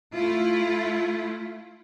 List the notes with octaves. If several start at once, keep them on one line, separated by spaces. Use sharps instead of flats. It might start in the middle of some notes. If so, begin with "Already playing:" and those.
A3 E4 F4